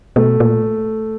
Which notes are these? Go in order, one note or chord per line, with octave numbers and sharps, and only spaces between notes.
B2 A3
A#2